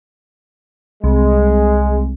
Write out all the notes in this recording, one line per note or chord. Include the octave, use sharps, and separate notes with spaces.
C2 G#3